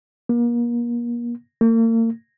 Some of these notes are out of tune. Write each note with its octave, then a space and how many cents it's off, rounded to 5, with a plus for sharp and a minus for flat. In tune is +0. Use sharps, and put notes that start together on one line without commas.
A#3 +35
A#3 -40